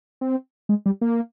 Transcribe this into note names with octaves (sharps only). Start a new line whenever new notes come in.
C4
G#3
G3
A#3